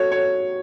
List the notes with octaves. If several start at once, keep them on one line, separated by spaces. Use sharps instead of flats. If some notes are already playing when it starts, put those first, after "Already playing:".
Already playing: F#4 A4 C#5
C#5